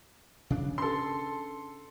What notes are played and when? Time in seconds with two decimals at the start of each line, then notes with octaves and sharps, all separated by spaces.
0.50 C#3 D4
0.78 A4 C6